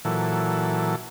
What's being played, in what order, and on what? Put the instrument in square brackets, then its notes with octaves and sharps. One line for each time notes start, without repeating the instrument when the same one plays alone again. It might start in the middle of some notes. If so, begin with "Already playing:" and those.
[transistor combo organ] A#2 E3 F#3 A4